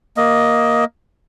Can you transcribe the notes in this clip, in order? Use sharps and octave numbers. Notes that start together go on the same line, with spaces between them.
A#3 D#5